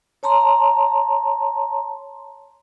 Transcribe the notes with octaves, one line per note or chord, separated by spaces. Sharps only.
C#5 A5 A#5 C6